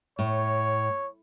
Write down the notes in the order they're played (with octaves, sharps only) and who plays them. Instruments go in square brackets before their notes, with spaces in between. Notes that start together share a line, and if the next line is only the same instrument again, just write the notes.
[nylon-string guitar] A2 [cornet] C#5